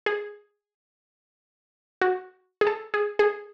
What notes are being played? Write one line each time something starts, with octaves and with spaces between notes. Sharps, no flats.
G#4
F#4
G#4
A4
G#4
G#4